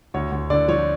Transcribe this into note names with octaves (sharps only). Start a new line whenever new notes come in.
D2 C#5
D2
D3 D5
F3 C#5